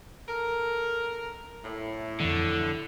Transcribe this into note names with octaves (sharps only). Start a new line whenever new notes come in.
A4 A#4
A2
F2 D3 E3